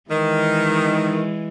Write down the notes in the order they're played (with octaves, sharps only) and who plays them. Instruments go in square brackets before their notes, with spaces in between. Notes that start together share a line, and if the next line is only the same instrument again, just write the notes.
[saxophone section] D#3 [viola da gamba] E3 G#3